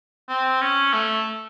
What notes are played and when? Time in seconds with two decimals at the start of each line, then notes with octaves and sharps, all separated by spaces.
0.29 C4
0.61 C#4
0.93 A3